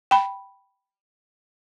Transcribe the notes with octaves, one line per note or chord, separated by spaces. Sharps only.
G5 B5